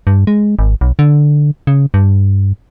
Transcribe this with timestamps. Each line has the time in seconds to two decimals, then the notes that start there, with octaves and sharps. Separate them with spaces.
0.07 G2
0.27 G#3
0.59 G#1
0.81 B1
0.99 D3
1.67 C#3
1.94 G2